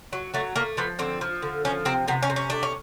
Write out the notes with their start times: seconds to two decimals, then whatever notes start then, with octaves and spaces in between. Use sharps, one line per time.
0.13 F#3
0.34 F#3 A3
0.56 A3 A#3
0.77 F3 B3
0.99 D3 C4
1.21 F3
1.42 D3
1.65 F3 C#4
1.85 C3 C4
2.08 C3 B3
2.23 C#4
2.30 C3
2.36 C#4
2.50 A3 D4
2.63 C#4